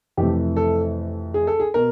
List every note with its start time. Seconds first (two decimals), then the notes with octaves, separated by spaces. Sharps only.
0.17 F2 C3 E3 A3 G4
0.57 A4
1.34 G#4
1.47 A4
1.60 G#4
1.74 B2 A#4